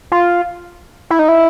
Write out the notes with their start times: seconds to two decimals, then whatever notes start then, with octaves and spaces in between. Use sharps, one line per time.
0.12 F4
1.10 E4
1.19 D#4
1.28 E4